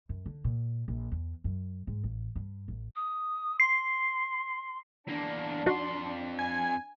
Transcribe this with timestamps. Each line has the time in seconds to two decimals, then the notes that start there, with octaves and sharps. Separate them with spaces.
0.09 F#2
0.26 D3
0.44 A#2
0.88 A#1
1.12 E2
1.44 F#2
1.87 G#2
2.04 A1
2.36 G2
2.68 A1
2.96 D#6
3.60 C6 C7
5.08 E2 A#3 D4
5.66 F2 D#4 F#4 C6
6.39 G#5